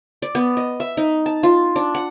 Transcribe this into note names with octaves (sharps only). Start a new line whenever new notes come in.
D5
B3
D#5
E5
D#4
A5
F4
D4
F#5